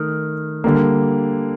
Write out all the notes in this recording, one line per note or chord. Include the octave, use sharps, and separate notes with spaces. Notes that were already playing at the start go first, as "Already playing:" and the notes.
Already playing: D#3 A3
D3 G3 A#3